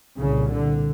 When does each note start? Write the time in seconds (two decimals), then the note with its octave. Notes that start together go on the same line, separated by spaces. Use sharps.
0.18 C2 A#2 C#3
0.53 D3